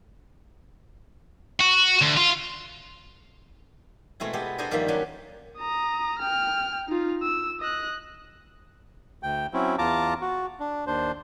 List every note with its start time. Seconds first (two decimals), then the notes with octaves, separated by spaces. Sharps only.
1.61 F#4
2.02 D2
2.18 F4
4.20 B2 G#3 A3 C4 E4
4.33 G#3 B3 G4 A4
4.58 D4 A4 C5 D#5 G#5 A#5
4.71 G2 D#3 F3 G3 A#3 E5
4.88 F#3 G3 C#4 D4
5.58 A#5 D#6
6.19 G5 F6
6.88 D#4 F4
7.23 E6
7.60 D#5 F#6
9.23 D2 G5
9.53 F#3 C4 C#4 E4
9.78 E2 F4 A5 A#5 D6
10.21 F#4
10.60 D4
10.87 D#2 D4 C5